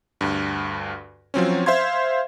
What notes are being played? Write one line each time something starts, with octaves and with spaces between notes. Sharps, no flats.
D2 G2
F3 F#3 C4 C#4
C5 E5 F5 C6 G#6